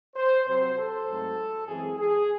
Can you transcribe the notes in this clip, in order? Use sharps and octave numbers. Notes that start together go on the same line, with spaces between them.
C5
C3 F#3 C4 C5
A4
G#2 F#3 A3 C4
F#2 E3 G#3 C4 G#4
G#4